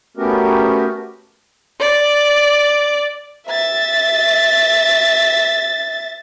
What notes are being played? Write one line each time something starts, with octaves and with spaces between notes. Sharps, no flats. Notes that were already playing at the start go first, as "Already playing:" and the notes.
A3 B3 C#4 F#4 G4 A#4
D5
E5 A6